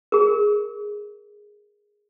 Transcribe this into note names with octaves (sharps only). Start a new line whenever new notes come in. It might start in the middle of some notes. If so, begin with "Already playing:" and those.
G#4 A#4